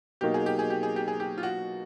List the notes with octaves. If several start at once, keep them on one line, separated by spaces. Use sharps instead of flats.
B2 F#3 A#3 D#4 G4
G#4
G4
G#4
G4
G#4
G4
G#4
G4
F4
F#4